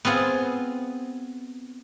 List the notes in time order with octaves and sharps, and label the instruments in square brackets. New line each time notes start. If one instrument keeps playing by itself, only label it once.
[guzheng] B3 C4 F4 G#4